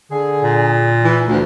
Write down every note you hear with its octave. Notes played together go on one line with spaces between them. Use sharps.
D3 G#4
A#2
E3
D2